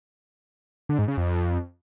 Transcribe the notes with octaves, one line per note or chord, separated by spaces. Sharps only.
D3
G#2
C#3
F2